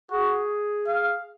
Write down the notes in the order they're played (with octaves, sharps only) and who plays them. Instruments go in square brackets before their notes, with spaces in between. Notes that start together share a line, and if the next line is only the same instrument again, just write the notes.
[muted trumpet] F#4 [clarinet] G#4
[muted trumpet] F5